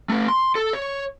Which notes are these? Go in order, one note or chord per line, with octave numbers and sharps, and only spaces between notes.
A3 B4
C6
A4
C#5